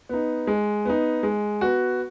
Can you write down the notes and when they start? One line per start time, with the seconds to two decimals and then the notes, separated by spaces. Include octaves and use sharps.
0.09 B3 D#4
0.47 G#3
0.85 B3 D#4
1.23 G#3
1.61 B3 F#4